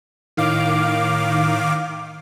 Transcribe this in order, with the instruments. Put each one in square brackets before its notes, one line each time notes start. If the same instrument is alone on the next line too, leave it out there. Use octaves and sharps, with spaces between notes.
[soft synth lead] A2 [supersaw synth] D#3 F5 D6